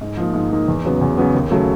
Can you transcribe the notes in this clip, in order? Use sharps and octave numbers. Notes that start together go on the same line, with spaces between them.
G#2
F3 A#3 D#4
G#2
F3 A#3 D#4
E2
C#3 F#3 B3
E2
C#3 F#3 B3
D#2
C#3 F#3 A3